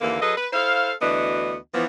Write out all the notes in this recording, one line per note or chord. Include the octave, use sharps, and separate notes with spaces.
D#2 D3 E3 A#3
F#3 G#4 A4 B4 D#5
B4
E4 A4 C5 F5
D2 E3 B3 D4 F#4 D#5
E3 F3 B3